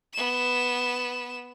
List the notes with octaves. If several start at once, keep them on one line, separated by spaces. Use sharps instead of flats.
B3 E7